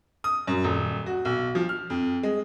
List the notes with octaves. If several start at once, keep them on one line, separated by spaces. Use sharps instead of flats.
D#6
F#2
D#1
F#4
B1
F3
F6
F2
G#3